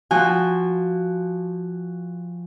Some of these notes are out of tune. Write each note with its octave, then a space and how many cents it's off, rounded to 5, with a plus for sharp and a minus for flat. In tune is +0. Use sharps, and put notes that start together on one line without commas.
F3 +0 F#4 +0 G#5 -30